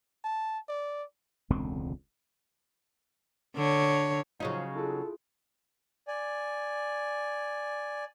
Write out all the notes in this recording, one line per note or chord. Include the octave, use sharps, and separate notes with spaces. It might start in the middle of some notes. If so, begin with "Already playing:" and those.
A5
D5
E1 C#2 D3 C4
D3 C#5
C#3 F3 F#3 D#4 F5
E4 F4 G#4 A4
D5 G#5